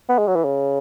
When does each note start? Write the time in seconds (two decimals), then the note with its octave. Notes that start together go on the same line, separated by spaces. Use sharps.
0.09 B3
0.18 G#3
0.27 F#3
0.36 E3
0.45 C#3